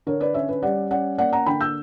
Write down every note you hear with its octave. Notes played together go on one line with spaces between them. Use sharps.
D3 A#4 C#5
B4 D5
C#4 C#5 E5
B4
G3 D5 F#5
C#4 D5 F#5
A#3 D5 F#5
F#5 A#5
D3 G5 B5
E6 G6